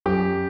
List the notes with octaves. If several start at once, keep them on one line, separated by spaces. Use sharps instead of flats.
F#2 G4